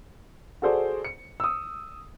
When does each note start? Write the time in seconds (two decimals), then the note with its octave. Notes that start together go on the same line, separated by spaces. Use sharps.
0.62 F#4 G#4 A4 C5 D5
1.05 C#7
1.40 D#6 E6